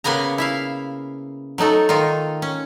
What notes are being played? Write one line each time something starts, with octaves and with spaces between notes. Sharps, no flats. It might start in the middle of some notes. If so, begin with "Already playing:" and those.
C#3 A#3 B3 G#5 A#5
E4 E5 F5
F#3 A3 D#4 A4
D#3 D#4 F4
C#4